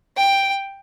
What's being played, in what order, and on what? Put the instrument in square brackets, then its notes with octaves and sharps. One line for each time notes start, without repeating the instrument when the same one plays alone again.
[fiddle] G5